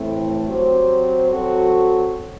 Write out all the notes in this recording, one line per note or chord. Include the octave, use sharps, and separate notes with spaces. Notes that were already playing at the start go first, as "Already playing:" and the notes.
Already playing: A2 E3 A3 C4 E4
F#3 C4 G4 C5
F#3 C4 F#4 A4